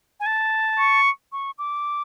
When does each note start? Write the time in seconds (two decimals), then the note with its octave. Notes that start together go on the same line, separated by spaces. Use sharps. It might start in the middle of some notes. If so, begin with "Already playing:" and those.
0.20 G#5
0.26 A5
0.79 C#6
1.32 C#6
1.59 D6